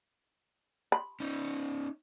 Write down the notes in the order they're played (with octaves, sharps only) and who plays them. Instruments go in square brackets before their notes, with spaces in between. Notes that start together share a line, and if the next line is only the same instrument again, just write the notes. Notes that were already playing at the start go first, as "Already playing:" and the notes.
[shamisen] B5
[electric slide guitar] C#4 D#4